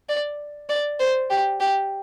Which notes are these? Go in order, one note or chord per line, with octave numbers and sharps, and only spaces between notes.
D5
D5
C5
G4
G4